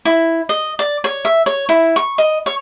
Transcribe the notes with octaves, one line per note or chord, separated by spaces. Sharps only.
E4
D#5
D5
C#5
E5
C#5
E4
C#6
D#5
C#5